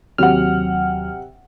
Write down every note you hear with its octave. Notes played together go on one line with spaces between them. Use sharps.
D#2 C3 F#3 F#5 F6